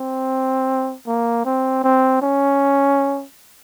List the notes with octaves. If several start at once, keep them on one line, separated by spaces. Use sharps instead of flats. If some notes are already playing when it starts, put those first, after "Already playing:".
Already playing: C4
A#3
C4
C4
C#4